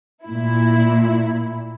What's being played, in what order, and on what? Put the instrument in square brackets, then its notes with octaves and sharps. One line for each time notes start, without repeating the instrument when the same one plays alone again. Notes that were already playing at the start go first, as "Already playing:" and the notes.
[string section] A#2 E4